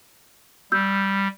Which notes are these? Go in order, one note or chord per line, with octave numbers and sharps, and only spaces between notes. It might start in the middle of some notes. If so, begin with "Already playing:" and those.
G3 E6 G6